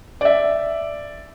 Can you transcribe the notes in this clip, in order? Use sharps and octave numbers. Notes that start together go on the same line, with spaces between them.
D5 E5